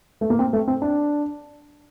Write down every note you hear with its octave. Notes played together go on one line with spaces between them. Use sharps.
A3
A#3
C4
A3
C4
D4